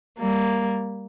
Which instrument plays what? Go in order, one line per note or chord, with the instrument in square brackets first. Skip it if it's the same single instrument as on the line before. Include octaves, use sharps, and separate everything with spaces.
[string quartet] G3 A#3